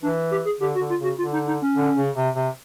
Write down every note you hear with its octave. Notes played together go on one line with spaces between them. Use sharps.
E3 D4
G4
G#4
D3 G4
F#4
D3
F4
C#3 F#4
D3 F4
D#4
D#4
C#4
D3
C#3
C3
C3